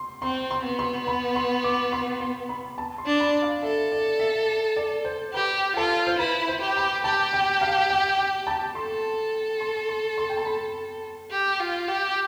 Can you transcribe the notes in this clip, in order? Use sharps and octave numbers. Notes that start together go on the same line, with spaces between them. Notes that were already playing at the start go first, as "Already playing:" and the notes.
Already playing: C6
C4 C6
C6
B3
C6
B5
C6
D6
C6
C6
B5
A5
C6
D4
B5
F5
A4 E5
D5
E5
D5
C5
G4 B4
F4 A4
C5
E4 B4
C5
G4
B5
G4 A5
G5
F5
G5
G5
A5
A4 C6
C6
C6
C6
G5
A5
B5
G4
F4
G4